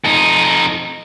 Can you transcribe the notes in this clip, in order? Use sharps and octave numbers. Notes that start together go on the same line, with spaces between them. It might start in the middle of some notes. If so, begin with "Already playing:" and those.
F2 D#4